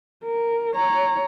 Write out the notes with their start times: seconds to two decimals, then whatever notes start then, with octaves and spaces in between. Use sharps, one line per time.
0.24 A#4
0.75 C#5 A#5